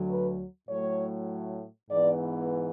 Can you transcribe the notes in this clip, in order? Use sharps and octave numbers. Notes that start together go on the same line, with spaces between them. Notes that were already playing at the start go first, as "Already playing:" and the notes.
Already playing: D2 D3 F#3
B4
A2 F#3 A3 C#5
G#2 E3 B3 D5